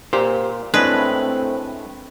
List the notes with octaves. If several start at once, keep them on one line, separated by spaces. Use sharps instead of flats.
A#2 G4 C5
A2 G#3 A3 C4 D4 B4